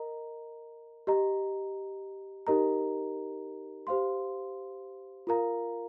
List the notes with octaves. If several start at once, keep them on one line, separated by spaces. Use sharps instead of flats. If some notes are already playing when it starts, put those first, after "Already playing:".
Already playing: A#4 D#5 A#5
G4 D#5 A#5
D#4 G4 A#4 D#5 A#5
G4 C5 F5 C6
F4 A#4 F5 A#5